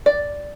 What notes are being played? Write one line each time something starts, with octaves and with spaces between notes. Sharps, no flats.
D5